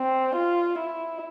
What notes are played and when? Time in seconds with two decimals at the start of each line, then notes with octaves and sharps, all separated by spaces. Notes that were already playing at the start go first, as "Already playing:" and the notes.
Already playing: C4
0.36 F4
0.78 E4